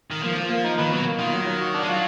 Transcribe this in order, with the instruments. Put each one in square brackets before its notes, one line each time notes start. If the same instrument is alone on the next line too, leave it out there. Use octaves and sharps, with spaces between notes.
[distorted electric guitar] D#3
[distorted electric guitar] F3 [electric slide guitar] A#3
[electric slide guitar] A#3
A#3
D#4
[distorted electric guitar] D#3 [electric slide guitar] B4
[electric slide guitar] B2 [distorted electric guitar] F#3
[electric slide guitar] A#3
[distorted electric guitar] D#3 [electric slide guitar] F4
[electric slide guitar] F#3
F#3
F#4
D4
[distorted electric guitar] G#3
[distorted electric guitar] F#3 [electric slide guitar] F4